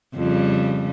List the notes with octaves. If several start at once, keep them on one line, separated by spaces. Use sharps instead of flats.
F2 C#3 G3